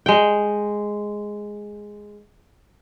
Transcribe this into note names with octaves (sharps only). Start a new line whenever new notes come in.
G#3 G5